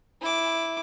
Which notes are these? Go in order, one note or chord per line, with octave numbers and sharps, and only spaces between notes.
E4 D6